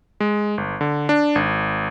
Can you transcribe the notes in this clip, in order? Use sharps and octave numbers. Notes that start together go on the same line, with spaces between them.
G#3
G1
D3
D4
G#1